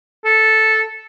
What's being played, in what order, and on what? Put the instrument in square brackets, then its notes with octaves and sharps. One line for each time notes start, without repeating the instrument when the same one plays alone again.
[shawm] A4